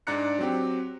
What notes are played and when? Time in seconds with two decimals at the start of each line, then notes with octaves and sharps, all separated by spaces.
0.07 G#2 D4 D5 A#5 F#6 C#7
0.39 F#3 C4 G4